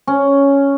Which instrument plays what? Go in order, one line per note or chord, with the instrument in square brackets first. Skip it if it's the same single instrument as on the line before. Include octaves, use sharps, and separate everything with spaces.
[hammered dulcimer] C#4